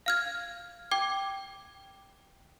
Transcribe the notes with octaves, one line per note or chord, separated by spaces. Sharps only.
F5 F6 G#6
G5 D6 G#6